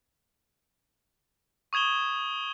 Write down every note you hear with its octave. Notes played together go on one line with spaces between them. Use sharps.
C#6 D#6 G#6 E7 G7